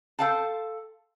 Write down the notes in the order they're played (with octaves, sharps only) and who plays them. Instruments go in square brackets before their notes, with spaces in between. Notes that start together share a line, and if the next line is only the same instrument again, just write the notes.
[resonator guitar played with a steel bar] A4 C5 F5 G5 A5